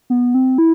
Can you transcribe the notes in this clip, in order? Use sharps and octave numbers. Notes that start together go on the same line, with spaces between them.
B3
C4
E4